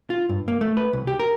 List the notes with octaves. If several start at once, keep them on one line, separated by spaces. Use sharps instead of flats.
F4
G2
A#3
A3
B4
C2
G4
A#4